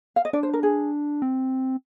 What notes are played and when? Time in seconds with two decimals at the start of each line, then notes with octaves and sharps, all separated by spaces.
0.16 F5
0.25 D#5
0.33 D4 D5
0.43 C5
0.53 A#4
0.63 G#4
1.22 C4